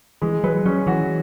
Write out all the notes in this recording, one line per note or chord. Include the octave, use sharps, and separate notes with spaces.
E3 G#3
F#3 B4
F#3 C#4
E3 F#4